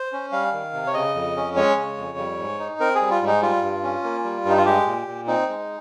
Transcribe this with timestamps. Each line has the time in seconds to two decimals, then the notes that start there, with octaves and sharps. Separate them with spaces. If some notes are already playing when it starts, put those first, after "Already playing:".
Already playing: C5
0.12 C#4
0.32 G3 F5
0.53 D#3
0.73 C3
0.87 C#5
0.94 C#3 D#5
1.15 F2
1.36 C#4
1.56 G#3 C#5
1.77 C#3
1.97 F2
2.18 G3
2.39 G#2
2.59 D#4
2.80 C4 A#4
2.95 G#4
3.01 G3
3.10 F4
3.22 G#2
3.27 D#4
3.41 G3 F4
3.63 G2
3.83 C#4
4.04 A#3
4.24 G3
4.45 G2 D#4
4.57 F4
4.65 G#3 G4
4.86 A#2
5.07 A#2
5.27 C4 D#4
5.48 G#3